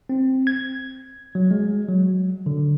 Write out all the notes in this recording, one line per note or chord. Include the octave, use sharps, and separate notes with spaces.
C4
G#6
F#3
G#3
F#3
D3